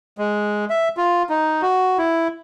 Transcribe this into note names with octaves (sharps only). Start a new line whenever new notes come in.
G#3
E5
F4
D#4
F#4
E4